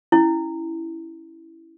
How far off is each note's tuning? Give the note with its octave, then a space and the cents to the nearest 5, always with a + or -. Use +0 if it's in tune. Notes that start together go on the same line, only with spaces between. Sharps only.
C#4 +0 E4 +0